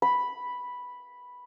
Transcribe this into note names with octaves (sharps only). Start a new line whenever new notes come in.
B5